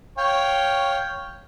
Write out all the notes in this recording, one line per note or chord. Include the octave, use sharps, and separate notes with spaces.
C#5 F5 G5